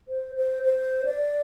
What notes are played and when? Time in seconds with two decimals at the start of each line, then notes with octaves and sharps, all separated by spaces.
0.08 C5
0.35 C5
0.63 C5
1.05 D5